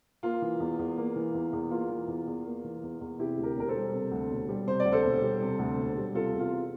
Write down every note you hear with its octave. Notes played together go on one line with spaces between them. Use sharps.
A#3 F4
E3
E2
E2
A#3
E3
E2
E2
A#3 F4
E3
E2
E2
A#3
E3
E2
E2
C3 E4 G4
D2
G4 A#4
E1 A#4
A4 C5
G3
C3
D2
E1
G3
C3 C5
D5
D2
A4 C5
E1
G3
C3
D2
E1
G3
C3 F4 A4
E2
F4